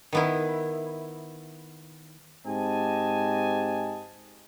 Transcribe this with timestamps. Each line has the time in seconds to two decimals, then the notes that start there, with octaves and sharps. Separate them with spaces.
0.13 D#3 B3 E4
2.46 G#2 C4 G4 D#5 G#5 A5